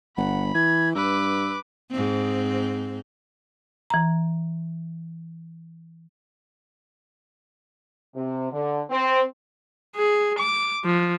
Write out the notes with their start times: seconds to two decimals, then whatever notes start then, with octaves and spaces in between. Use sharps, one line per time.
0.17 G1 F#5 B5
0.54 E3 G#6
0.95 G2 B4 D6 E6
1.90 G#2 C4
3.90 E3 A#5
8.15 C3
8.52 D3
8.90 C4
9.96 G#4
10.39 D6
10.85 F3